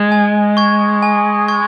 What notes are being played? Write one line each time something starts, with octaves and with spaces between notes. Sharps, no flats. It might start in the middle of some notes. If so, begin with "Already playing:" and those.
Already playing: G#3
G#5
C#6 G#6
G#5
C#6 G#6